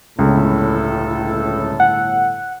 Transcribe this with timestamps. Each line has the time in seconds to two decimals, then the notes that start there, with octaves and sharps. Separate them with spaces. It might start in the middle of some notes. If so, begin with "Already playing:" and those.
0.19 G1 C#2 A2 A4
1.80 F#5